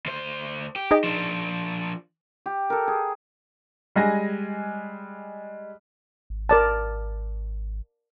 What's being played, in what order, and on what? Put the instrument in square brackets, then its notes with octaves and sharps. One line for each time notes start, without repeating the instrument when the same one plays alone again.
[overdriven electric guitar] D2 C5
G4
[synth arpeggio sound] D#4 G#4 D#5
[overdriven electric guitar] F3 D4
[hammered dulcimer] G4
A4 A#4
G#4
[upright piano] G3 G#3 G#5 A#6
[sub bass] G#1
[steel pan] A#4 D5 A5